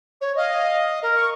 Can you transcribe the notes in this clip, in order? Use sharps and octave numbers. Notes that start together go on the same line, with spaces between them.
C#5
D#5 F5
A#4
C#6